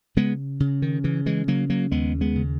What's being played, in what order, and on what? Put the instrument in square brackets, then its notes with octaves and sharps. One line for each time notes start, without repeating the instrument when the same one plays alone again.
[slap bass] C#3 G#3 B3
C#3
D#3
C#3 E3
E3 G#3
C#3 F#3 A#3
F#3 A#3
D#2 G#3 B3
G#3 B3
C#3